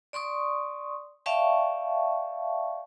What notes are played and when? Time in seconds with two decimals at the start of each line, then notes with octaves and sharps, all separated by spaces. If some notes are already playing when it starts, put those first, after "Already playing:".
0.13 D5 C6 C#6 D#6
1.26 D5 E5 F5 G5 A5 C#6